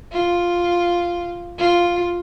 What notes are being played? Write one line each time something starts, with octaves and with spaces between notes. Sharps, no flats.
F4
F4